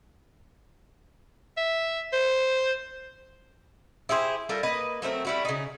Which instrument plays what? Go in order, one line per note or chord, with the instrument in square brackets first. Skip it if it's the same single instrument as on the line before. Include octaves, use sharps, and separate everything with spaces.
[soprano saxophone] E5
C5
[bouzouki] E4 G4 G#4 C5
G3 F4 A4 A#4
A#3 B4 D#5
F#3 A3 C4 A#4
G3 E4 F#4
C#3 D#4